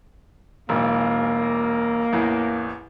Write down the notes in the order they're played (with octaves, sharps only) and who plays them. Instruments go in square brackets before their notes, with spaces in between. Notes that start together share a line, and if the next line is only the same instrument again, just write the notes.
[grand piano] E1 B1 [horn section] A#3
[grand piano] A1 E2